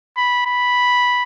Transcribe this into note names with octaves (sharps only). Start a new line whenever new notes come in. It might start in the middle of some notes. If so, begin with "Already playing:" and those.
B5
B5